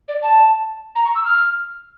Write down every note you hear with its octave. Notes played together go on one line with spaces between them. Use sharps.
D5
A5
A#5
C#6
E6
F6